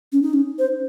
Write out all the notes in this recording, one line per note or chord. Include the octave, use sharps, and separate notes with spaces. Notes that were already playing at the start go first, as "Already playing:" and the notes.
C#4
D#4
C#4
C5